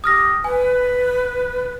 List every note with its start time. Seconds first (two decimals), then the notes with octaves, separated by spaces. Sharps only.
0.04 G4 D#6 F6 A#6
0.44 B4 G#5